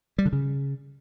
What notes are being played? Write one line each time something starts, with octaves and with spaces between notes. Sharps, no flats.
G3
D3
C#3